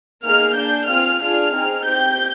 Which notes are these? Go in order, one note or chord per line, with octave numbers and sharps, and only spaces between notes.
A#3 D#4 G#4 F6
D4 G#4 G6
C4 F4 G#4 F6
D4 F4 G#4 F6
C4 D#4 G#4
C4 G4 G6